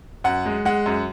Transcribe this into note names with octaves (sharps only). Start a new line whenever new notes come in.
F#2 F#5
G#3
G#3 F#5
F#2